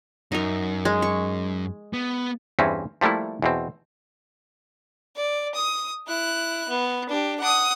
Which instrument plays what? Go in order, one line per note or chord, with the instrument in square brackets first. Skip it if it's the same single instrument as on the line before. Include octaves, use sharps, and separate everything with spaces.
[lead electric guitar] F#2 [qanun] D#4 A#4
[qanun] G#3
C#6
[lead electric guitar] B3
[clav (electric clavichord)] E2 G2 E3 C4 C#4
F3 G3 A3 A#3 E4
E2 B2 C4
[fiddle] D5
D#6
E4 F#6
B3
D4 G4
F#5 D#6